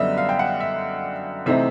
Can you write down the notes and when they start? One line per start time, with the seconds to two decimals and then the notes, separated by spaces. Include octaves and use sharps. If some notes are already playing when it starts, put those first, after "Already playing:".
Already playing: F#2 D3 G3 B3 D#5 E5
0.17 F5
0.29 G5
0.39 F#5
0.60 E5
1.46 C3 E3 A3 C4 D#4 E5